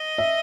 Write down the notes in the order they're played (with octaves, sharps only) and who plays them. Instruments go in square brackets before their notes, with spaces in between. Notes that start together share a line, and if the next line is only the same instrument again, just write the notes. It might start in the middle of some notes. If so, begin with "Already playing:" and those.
Already playing: [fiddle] D#5
[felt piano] E5